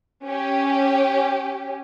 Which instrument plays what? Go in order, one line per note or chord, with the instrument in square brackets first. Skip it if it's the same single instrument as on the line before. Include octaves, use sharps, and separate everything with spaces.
[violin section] C#4 G4